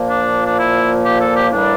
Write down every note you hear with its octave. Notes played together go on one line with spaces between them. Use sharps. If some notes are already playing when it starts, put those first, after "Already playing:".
Already playing: A#2 F3 A#3
D4
D4
E4
G4
A4
G4
A2 E3 G3 A#3 D4